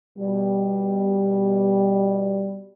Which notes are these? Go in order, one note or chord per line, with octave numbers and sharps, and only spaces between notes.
B2 G3